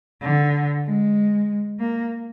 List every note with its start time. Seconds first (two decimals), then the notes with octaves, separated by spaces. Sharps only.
0.22 D3
0.85 G#3
1.80 A#3